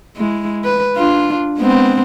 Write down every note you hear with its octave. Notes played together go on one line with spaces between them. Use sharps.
G#3 E4
B4
D4 F4
G#3 B3 C4